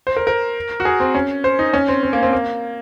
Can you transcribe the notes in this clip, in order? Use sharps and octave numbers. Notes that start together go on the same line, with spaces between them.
C5
A#4
A#4
F#4
G#4
C4
C#4
C5
D#4
C#4
C4
C4
A#3
C4
A#3